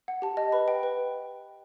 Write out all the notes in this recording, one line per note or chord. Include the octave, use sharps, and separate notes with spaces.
F#5
G4 A5
D#5
B4 B5
G5
B4